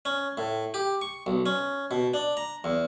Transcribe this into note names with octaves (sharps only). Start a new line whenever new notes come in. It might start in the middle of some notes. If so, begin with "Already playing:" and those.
C#4
A2
G4
C#6
B1
C#4
B2
D4
A#5
E2